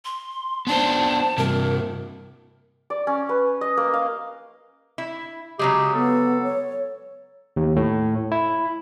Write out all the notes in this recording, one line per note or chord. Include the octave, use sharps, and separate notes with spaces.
C6
B3 D4 C5 A5
G2 C3 A#4
D5
C#4
B4
D#5
A#3
F5
E4
C#3 F#3 G#3 G4
B3 A4
C#5
D#2
A2
E4